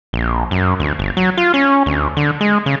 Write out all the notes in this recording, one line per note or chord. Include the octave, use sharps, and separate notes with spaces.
A#1
F#2
D2
G1
F#3
F4
C#4
D2
D3
G#3
C#3